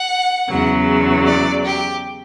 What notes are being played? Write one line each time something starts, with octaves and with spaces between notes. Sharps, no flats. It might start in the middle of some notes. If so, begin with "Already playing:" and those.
Already playing: F#5
E2 C#3 F#3
D5
G4